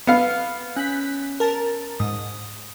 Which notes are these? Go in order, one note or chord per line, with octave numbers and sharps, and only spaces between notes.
B3 F5
C#4 F#6 B6
A#4 A5
G#2 D#6